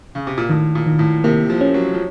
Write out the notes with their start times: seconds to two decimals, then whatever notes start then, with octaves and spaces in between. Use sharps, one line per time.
0.15 C#3
0.27 C3
0.38 A#2
0.49 A2 D#3
0.75 A#2
0.87 D#3
0.99 A2
1.24 C3 A#3
1.50 F3
1.61 C#4
1.74 F#3
1.94 F3